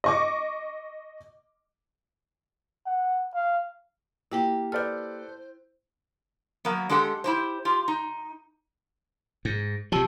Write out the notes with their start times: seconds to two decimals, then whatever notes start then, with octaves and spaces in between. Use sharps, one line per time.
0.04 D#5 C#6 D6
2.86 F#5
3.34 F5
4.32 A#3 E4 G4 G5
4.72 A4 B4 C5 D5 F6 G6
6.65 F#3 A#3 B3
6.90 G#3 D4 G4 A4 F#5
7.24 E4 G4 C5
7.65 F4 G4
7.88 D#4
9.45 G#2
9.92 C3 F3 G4 A5 E6